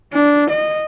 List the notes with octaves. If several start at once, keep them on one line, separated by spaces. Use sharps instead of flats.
D4
D#5